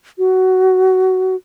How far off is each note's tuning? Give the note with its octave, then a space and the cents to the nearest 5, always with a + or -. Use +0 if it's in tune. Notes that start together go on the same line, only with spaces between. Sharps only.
F#4 +15